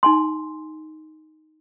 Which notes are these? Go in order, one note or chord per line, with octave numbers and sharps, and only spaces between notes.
D#4 G#5 C6